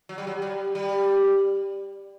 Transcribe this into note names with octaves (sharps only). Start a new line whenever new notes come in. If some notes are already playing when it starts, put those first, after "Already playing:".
F#3
G3
F#3
G3
G3